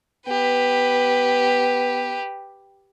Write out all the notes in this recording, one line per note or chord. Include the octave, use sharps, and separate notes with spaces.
B3 G4 B4